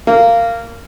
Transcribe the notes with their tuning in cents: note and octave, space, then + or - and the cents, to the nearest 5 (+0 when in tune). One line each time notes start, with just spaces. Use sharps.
A#3 -15